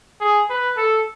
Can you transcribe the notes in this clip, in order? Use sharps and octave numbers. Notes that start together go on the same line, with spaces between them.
G#4
B4
A4